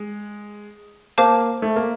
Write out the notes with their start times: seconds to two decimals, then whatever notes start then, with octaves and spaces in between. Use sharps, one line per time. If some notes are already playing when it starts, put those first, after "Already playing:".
Already playing: G#3
1.18 A#3 C5 F5 A5 D6
1.62 A3
1.76 A#3